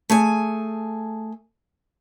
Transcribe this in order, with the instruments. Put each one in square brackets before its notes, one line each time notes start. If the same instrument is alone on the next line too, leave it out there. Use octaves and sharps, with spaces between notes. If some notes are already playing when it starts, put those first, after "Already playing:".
[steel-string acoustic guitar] A3 G#4 G#5